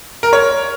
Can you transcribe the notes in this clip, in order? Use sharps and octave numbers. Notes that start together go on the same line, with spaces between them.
A#4
C#5